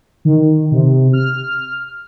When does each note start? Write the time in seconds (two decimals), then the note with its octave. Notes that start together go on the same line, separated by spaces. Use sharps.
0.25 D#3
0.72 C3
1.13 F6